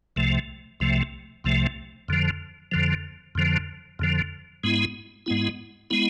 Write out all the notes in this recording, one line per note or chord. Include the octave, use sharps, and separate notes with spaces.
C2 C3 F3 A3
C2 C3 F3 A3
C2 C3 F3 A3
F2 D3 F3
F2 D3 F3
F2 D3 F3
F2 D3 F3
G#2 G#3 B3 E4
G#2 G#3 B3 E4
G#3 B3 E4